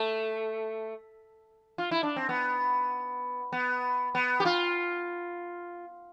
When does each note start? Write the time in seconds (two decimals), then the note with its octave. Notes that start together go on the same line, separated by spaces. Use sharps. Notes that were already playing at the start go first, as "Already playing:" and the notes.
Already playing: A3
1.78 F4
1.91 E4
2.03 D4
2.16 C4
2.29 B3
3.52 B3
4.15 B3
4.40 G4
4.45 F4